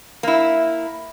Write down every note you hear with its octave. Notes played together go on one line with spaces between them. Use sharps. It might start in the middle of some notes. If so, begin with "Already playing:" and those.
A#3 E4